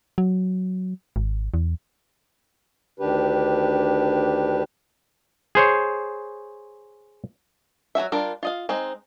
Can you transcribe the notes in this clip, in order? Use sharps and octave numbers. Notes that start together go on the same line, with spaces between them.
F#3
G#1
E2
D2 D#3 D4 G4 B4
G#4 C5 C#5
F#3 C#4 F#4 E5
G3 D4 F4 A#4
F4 D#5 F5
G#3 C4 D#4